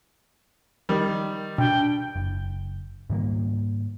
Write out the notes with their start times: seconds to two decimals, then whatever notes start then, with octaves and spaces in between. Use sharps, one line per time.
0.89 D#3 G3
1.58 B2 D4 G5
2.16 F#1
3.10 G#2 D#3 G3 A#3